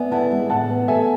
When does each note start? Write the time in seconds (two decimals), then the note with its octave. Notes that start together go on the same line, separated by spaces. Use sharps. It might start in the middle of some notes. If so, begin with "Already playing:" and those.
Already playing: B3 D5 E5 G#5
0.11 E4 F#5 A5
0.31 G#3
0.50 A2 F#5 A5
0.69 B3
0.88 A4 E5 G#5